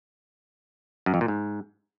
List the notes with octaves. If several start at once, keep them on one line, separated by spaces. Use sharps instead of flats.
F#2
F2
A#2
G#2